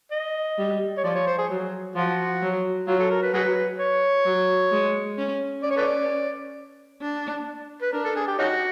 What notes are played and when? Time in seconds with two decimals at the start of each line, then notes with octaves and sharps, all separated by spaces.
0.12 D#5
0.58 G3
0.98 C#5
1.04 F3 D5
1.15 C#5
1.27 C5
1.38 G#4
1.49 F#3
1.96 F3 F#4
2.42 F#3
2.87 F#3 F4
2.99 A4
3.11 A#4
3.23 B4
3.33 F#3 F#4 G#4 B4
3.79 C#5
4.25 F#3
4.71 G#3
5.18 C#4
5.63 C#4 D5
5.71 C#5
5.77 A4 B4 D5
7.01 D4
7.82 B4
7.92 D4 A#4
8.05 A4
8.16 G#4
8.27 G4
8.39 C#4 D#4 F#4